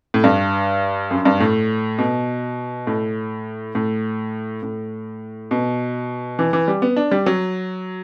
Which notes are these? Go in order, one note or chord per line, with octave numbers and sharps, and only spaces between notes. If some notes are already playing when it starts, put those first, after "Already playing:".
A2
G2
F#2
G2
A2
B2
A2
A2
A2
B2
E3
E3
G3
B3
D4
G3
F#3